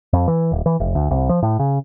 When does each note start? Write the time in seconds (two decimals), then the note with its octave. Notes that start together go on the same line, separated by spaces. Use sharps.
0.13 F2
0.28 E3
0.52 D#1
0.66 E3
0.80 F1
0.95 D2
1.11 C2
1.29 F3
1.42 A2
1.59 C#3